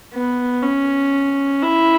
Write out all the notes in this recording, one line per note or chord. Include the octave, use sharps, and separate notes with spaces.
B3
C#4
E4